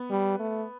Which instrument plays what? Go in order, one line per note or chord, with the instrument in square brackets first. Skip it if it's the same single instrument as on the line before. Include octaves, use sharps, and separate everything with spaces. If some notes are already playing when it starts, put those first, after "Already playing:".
Already playing: [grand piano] B3
[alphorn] G3
A3